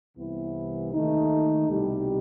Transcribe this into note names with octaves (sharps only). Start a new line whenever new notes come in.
C2 C3 E3 B3 E4
D#2 D#3 A3 D#4
C2 B2 G3 D#4 G4